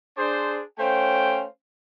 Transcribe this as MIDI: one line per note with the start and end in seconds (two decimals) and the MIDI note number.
0.17 0.61 62
0.17 0.61 68
0.17 0.61 72
0.79 1.45 57
0.79 1.45 61
0.79 1.45 72
0.79 1.45 77
0.79 1.45 79